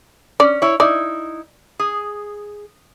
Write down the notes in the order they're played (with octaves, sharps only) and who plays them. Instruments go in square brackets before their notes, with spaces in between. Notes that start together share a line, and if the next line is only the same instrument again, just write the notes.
[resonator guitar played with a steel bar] C#4 [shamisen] D5
[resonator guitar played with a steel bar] E4 C#5
[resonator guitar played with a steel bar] D#4 E4 [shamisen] D5
[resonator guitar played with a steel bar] G#4